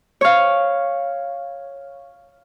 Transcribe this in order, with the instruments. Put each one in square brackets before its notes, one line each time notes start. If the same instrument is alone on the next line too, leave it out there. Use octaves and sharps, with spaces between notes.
[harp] C#5 F5